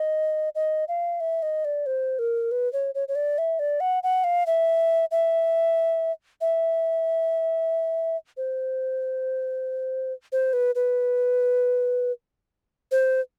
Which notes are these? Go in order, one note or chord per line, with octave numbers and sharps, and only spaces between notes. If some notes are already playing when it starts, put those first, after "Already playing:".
Already playing: D#5
D#5
F5
E5
D#5
D5
C5
A#4
B4
C#5
C#5
C#5
D5
E5
D5
F#5
F#5
F5
E5
E5
E5
C5
C5
B4
B4
C5